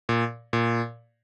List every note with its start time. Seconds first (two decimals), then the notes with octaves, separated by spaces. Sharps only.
0.09 A#2
0.53 A#2